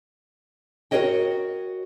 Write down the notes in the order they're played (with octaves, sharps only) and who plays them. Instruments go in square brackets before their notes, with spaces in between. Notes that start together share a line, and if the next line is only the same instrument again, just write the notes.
[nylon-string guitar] F#4 G#4 A#4 C#5 D#5 G5